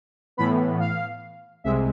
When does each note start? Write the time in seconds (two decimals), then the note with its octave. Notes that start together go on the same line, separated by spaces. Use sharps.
0.37 A2 E3 B3 B5
0.80 F5
1.64 C2 C3 G#3 E5